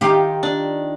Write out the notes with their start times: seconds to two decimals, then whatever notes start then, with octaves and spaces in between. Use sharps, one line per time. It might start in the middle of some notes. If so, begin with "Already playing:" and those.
0.01 D#3 F4 G4
0.43 D4